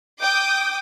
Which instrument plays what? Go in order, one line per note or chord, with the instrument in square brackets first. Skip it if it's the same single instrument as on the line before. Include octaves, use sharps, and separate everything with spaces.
[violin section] G5 D6 D#6 [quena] G6